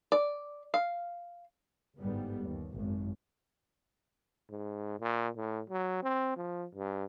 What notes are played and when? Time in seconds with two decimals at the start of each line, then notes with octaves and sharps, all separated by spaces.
0.12 D5
0.74 F5
1.98 G1 G#2 G3 B3
2.44 D#2
2.73 G#1 F#2
4.50 G#2
5.00 A#2
5.36 A2
5.69 F#3
6.03 C4
6.36 F3
6.75 G2